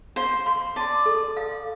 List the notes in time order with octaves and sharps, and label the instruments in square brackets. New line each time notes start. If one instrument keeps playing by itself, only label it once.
[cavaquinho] C5 [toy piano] F5
[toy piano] C6
[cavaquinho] D5 [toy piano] A5
[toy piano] A4
F5